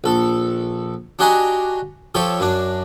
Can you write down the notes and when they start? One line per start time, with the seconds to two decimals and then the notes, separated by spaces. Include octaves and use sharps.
0.04 A#1 A4
1.19 D4 F#4 G4 D#5 G#5 A#5
2.15 F3 G4 A4 C#5
2.40 F#2 D4